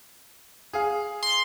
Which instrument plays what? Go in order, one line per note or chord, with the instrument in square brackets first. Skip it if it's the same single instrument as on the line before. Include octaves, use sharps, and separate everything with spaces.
[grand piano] G#4 F5
[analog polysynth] C6